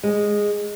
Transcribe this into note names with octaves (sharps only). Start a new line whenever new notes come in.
G#3